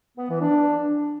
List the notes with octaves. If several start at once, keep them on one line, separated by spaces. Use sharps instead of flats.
B3
E3
D4